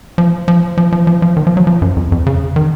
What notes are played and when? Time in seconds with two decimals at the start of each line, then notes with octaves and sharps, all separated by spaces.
0.18 F3
0.48 F3
0.77 F3
0.92 F3
1.07 F3
1.22 F3
1.37 D#3
1.47 F3
1.57 F#3
1.67 F3
1.82 F#2
1.97 F2
2.12 F2
2.26 C#3
2.56 D#3